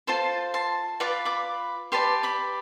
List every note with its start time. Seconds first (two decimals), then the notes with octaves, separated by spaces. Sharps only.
0.07 F4 A4 C5 A5 C6
0.54 A5 C6
1.00 F4 B4 D5 D6
1.25 B5 D6
1.92 G4 B4 D5 A5 C6
2.23 B5 D6